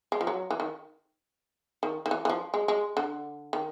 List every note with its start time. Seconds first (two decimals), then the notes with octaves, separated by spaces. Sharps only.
0.12 G#3
0.21 F3
0.27 F#3
0.51 E3
0.60 D#3
1.83 D#3
2.06 D#3
2.11 E3
2.25 E3
2.30 F3
2.54 G#3
2.68 G#3
2.97 D3
3.53 D#3